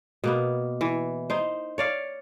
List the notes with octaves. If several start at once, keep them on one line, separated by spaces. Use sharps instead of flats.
B2 A#3 B3
E3
D#4 C5
C#5 D5 F5